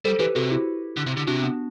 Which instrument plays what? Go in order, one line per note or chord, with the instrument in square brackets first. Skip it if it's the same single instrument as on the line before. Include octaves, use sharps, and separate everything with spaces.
[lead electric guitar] G3 [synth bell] A4 C5
[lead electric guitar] E3 [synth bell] G4 B4
[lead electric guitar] C3 [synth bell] F#4 A4
[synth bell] E4 G4
[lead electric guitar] D3
C3
D3
[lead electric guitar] C3 [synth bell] D4 F#4
[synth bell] B3 D4